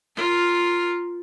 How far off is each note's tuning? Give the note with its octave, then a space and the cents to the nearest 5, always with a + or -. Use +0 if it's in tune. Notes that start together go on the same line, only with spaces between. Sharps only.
F4 +0 A#4 +0